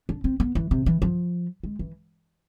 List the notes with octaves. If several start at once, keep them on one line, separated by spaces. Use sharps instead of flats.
D4
C4
B3
E3
C3
E3
F3
G#3
E3